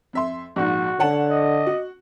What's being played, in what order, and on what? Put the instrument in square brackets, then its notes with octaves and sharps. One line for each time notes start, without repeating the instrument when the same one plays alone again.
[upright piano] F2 E5 C6
[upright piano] A#1 G#2 [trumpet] F#4
[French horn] D3 [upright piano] C#5 F#5 A5
[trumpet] D#5
[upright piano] F#4